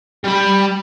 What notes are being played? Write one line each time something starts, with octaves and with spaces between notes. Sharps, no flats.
G3 B5